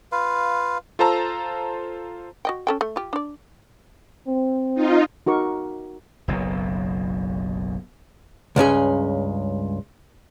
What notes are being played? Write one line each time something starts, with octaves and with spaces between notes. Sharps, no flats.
F4 B4 F5
F4 A4 C5 A5 A#5 E6
F#4 D#5 G5
C#4 A4 G5
A3
F4 G4
D4 D5
C4
D#4 F4
D#4 F#4 A#4 C#6 D6
F#1 B1 B2 F#3
C#2 G2 C#4 G#4